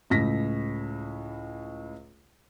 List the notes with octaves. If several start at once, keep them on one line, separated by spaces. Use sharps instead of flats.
C#2 A2 A#6 B6